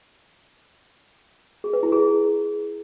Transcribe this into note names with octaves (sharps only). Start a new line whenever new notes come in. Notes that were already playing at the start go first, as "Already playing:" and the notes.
G#4
B4
E4
G#4